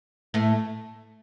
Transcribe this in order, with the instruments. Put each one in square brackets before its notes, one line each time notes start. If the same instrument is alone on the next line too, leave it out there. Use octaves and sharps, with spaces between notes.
[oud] A2 A3